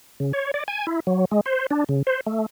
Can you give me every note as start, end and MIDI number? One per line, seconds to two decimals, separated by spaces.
0.20 0.32 49
0.33 0.51 73
0.54 0.63 74
0.68 0.87 80
0.87 1.00 64
1.07 1.25 54
1.31 1.41 56
1.46 1.66 72
1.71 1.84 62
1.89 2.02 49
2.07 2.20 72
2.27 2.46 57